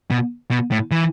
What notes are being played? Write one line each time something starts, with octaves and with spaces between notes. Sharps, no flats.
B2
B2
A2
E3